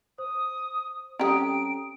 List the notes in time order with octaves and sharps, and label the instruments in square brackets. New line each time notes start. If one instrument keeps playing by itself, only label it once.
[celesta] C5 [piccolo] D#6
[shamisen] G3 G4 [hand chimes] C4 C#4 A4 [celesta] A#5 D#6 [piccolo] D7